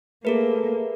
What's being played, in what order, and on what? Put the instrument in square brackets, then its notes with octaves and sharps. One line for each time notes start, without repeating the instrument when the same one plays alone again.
[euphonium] A3 [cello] A#3 [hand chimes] G#4 A#4 B4